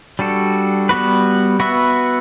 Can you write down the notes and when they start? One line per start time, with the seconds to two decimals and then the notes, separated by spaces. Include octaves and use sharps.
0.19 G3 D4 F#4 A4
0.89 G3 B3 F#4 B4
1.60 B3 F#4 B4 E5